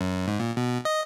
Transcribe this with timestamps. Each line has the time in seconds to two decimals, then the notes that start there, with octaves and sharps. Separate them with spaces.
0.01 F#2
0.27 G#2
0.39 A#2
0.57 B2
0.85 D#5